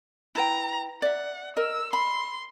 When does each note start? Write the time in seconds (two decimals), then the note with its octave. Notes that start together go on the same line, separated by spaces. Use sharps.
0.35 E4 B4 G5 A#5
1.02 D5 E5 F#5
1.56 A#4 D#5 E6
1.93 B5 C6